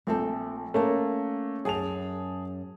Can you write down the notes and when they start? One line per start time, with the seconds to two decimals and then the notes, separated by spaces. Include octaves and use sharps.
0.07 A#1 A3 C4 A4
0.74 A3 A#3 C#4 A#4 A5
1.65 F#2 G#4 A5 F7